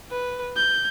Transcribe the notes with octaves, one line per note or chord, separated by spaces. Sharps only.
B4
G6